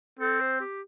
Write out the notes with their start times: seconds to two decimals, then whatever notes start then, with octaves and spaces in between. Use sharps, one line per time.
0.19 C4 A4
0.40 C5
0.60 G4